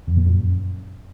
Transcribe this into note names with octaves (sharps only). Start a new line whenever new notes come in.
F2
A#2
F#2